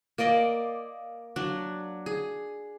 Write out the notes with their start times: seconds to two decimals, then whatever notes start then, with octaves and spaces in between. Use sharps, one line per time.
0.18 A#3 A#4 D5 D#5
1.36 F#3 D4
2.06 G#4